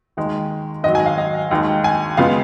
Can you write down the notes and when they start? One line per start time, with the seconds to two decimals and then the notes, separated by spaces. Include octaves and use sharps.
0.17 D#2 D#3 G#3
0.83 G#2 D#3 F#3 D#5
0.95 G#5
1.06 F5
1.18 D#5
1.51 D#2 D#3 G#3
1.84 G#5
2.17 C#3 G#3 B3 F4 F5